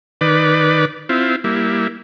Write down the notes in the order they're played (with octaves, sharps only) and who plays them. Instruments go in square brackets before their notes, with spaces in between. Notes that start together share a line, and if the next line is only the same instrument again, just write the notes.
[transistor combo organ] D#3 B4 D5
C4 E4 F4
G3 A#3 E4